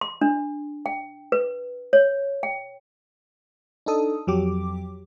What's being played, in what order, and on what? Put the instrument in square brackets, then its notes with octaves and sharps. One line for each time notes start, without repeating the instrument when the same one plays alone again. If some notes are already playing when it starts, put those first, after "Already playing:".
[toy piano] C6
D4
G5
B4
C#5
G5
[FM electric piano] D4 D#4 A4 D#6
F2 F#3 G4 D6